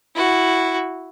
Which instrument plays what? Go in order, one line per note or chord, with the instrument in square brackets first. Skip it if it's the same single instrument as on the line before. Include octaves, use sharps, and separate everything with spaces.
[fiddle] E4 F#4